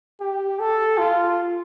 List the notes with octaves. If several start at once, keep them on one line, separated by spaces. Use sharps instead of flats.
G4
A4
F4